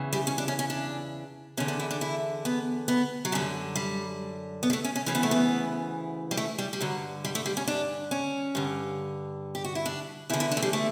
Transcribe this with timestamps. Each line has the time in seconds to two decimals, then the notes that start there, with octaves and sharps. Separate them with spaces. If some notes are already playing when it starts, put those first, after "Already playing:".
Already playing: E2 C#3 E3
0.13 G3
0.27 C#4
0.38 D4
0.48 C#4
0.59 C#4
0.70 D4
1.57 E2 D3 C#4
1.68 D4
1.80 E4
1.91 D4
2.01 E4
2.45 B3
2.88 B3
3.25 F#3
3.32 F#2 D3 G3
3.76 G3
4.63 B3
4.70 G3
4.73 A3
4.84 C#4
4.96 C#4
5.06 D2 C#3 E3 C#4
5.15 B3
5.23 A3
5.31 B3
6.31 G3
6.37 A3
6.58 G3
6.73 G3
6.81 G2 D3 F#3
7.25 G3
7.35 A3
7.46 G3
7.57 C#4
7.68 D4
8.11 C#4
8.55 G2 D3
9.55 G4
9.64 F#4
9.75 E4
9.86 D4
10.30 E2 E4
10.33 D3
10.40 E4
10.52 D4
10.57 A3
10.63 G3
10.73 A3